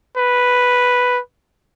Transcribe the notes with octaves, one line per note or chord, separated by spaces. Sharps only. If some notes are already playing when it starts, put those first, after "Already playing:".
B4